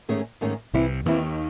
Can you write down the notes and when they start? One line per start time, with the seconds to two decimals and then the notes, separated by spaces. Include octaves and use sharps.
0.09 G#2 D#3 A3 C#4 G#4
0.41 G#2 D#3 A3 C#4 G#4
0.73 C2 C3 E3 C4 E4
1.06 D#2 D#3 E3 C4 E4